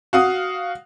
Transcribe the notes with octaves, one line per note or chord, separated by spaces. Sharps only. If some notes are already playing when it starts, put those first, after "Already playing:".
F#4 F5 D#6